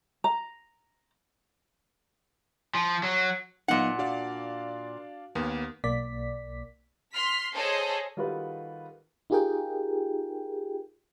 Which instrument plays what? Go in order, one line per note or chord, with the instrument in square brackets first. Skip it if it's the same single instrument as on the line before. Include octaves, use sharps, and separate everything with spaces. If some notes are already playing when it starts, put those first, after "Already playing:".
[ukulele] A#5
[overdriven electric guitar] F3
F#3
[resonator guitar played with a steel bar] A#2 F#5 [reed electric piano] F#3 B3 D#4 [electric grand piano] D#5 F5
[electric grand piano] D4 D5 F5 [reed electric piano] F#4
[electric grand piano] D#2 A#3 B3
[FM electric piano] B1 A#3 D5 B6
[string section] C6 F6 B6
G#4 A4 C5 C#5 D#5
[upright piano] D#3 G3 F4 F#4 A4 B4
[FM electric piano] D#4 F4 G4 G#4 A#4 G5